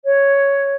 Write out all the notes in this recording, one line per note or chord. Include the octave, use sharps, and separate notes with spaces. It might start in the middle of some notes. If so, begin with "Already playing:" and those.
C#5